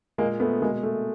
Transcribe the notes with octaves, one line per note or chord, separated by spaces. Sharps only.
A#2 G#3 A#3
A3 B3
B2 G#3 A#3
A3